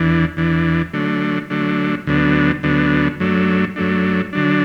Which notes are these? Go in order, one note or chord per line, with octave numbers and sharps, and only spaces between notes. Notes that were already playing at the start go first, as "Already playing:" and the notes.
Already playing: E2 E3 D4
E2 E3 D4
D3 F#3 A3 D4
D3 F#3 A3 D4
D2 D3 F#3 B3 D4
D2 D3 F#3 B3 D4
F#2 F#3 A3 D4
F#2 F#3 A3 D4
D3 F#3 D4